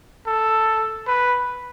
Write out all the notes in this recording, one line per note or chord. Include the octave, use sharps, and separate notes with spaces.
A4
B4